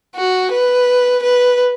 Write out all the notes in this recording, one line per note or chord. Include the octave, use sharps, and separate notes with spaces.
F#4
B4
B4